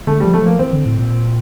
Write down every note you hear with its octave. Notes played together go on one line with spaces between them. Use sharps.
D3 A3
F3 G3
A3
F3 A#3
E3 C4
D3
A2
A#2